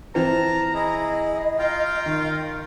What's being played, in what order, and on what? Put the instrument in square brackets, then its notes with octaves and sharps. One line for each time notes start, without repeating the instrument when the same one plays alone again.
[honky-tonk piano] E3 C4 [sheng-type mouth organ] A5 F6 [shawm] A#5
[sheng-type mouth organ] E4 G#4 [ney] D#5
[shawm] F4 [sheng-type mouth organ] F5 G5 A#5
[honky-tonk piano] D#3